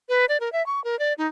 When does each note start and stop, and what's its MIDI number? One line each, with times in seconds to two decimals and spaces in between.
0.09 0.25 71
0.29 0.37 74
0.40 0.52 70
0.52 0.65 76
0.66 0.83 85
0.84 0.98 70
0.99 1.13 74
1.18 1.27 63